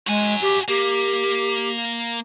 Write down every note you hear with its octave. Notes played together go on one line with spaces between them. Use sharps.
G#3 F#4 G#5
G4
A#3 G4